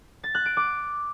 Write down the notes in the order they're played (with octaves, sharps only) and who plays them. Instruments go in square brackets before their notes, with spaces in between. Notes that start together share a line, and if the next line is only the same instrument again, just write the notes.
[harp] A6
F#6
D7
D6